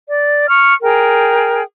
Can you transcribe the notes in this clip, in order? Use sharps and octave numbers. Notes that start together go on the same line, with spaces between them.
D5
C#6 F6
G#4 A#4 G5